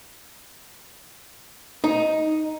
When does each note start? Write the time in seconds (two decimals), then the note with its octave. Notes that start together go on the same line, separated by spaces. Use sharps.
1.84 D#4